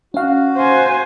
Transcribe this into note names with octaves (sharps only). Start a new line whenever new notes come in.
C#4 F#4 F5
C5 G#5